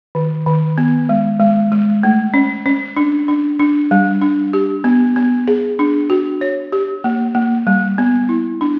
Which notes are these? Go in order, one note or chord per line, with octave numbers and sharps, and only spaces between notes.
D#3
D#3
B3
G#3
G#3
G#3
A3
C#4
C#4
D4
D4
D4
G3
D4
G4
B3
B3
G#4
D4
F#4
C#5
G4
A#3
A#3
G3
B3
E4
D4